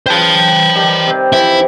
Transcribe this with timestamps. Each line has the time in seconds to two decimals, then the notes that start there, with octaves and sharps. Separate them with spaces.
0.06 C#3 B4 C5 G5 A5
0.75 D#3 G3
1.07 C3
1.33 E3 F3 E4